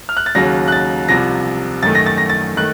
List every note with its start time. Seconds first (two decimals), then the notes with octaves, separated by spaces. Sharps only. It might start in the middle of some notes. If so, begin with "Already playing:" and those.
0.09 F6
0.17 F#6
0.26 A6
0.35 D#2 C#3 F#3 A#6
0.68 F#6
0.72 A6
1.09 C2 C3 F3 A#6
1.83 F#2 D#3 A3 A6
1.95 A#6
2.06 A6
2.18 A#6
2.29 A6
2.57 D#3 A3 F#6